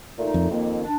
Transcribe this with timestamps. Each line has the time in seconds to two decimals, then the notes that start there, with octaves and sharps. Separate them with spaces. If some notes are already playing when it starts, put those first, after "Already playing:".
0.18 A#2 A3 D#4
0.34 F2
0.51 F2 D#3 A#3
0.84 D4